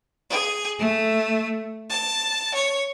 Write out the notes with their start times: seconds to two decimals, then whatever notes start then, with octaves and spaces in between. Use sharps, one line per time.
0.29 G#4
0.79 A3
1.89 A5
2.53 C#5